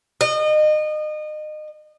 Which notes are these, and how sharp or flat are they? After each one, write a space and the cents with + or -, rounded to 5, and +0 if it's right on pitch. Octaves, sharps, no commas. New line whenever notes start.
D#5 -30